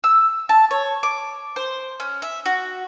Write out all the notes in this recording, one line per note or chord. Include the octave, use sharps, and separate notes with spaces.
E6
A5
C#5
D6
C5
C#4
E5
F#4